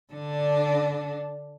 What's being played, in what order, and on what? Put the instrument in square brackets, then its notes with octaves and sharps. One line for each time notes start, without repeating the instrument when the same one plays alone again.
[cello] D3 D4